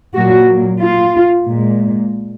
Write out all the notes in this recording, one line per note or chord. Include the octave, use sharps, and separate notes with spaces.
A#2 F#3 A#3 F#4
F4
A#2 G#3